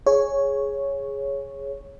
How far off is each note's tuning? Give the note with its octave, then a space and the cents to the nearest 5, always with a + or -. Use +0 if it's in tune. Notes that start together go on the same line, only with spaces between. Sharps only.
G#4 +0 C#5 +0